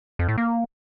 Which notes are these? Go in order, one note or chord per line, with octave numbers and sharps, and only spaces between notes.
F2
A2
A#3